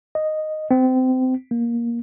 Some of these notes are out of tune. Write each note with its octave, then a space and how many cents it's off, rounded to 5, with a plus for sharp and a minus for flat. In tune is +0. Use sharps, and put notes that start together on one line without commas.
D#5 -5
C4 -25
A#3 +15